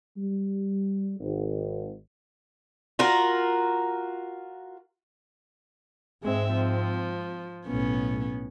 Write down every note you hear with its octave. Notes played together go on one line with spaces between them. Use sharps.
G3
G#1
F4 F#4 A#4
G#2 G#3 C4 E5
F3
B1 A2 B3 C#4